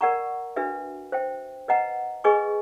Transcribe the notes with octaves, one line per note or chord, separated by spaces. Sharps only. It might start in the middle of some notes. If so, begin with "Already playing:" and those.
A#4 D5 F#5 A#5 C#6
D4 F#4 B4 E5
C5 E5 G5
B4 D#5 F#5 A#5
G#4 B4 D#5 G#5 C#6